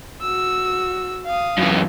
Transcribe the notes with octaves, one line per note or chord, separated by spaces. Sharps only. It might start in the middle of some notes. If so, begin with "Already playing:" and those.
F#4 E6
F5 D#6
F#2 E3